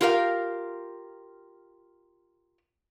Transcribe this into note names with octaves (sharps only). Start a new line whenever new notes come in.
F4 G4 A#4 E5 F5